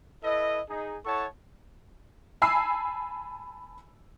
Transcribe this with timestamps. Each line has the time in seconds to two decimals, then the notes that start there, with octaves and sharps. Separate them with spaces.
0.23 E4 A4 B4 D#5
0.69 D#4 G#4
1.05 E4 A4 C#5 F#5 A5 C#6
2.42 G#5 A5 B5 E6 C7